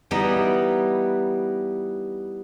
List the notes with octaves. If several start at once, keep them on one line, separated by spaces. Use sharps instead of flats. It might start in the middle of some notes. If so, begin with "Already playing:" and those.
E3 G3 B3 D#4